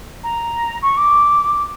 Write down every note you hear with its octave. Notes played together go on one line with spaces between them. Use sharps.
A#5
C#6
D6